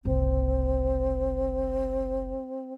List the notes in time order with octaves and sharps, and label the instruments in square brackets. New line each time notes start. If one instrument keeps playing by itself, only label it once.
[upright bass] F#1 C2 [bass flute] C4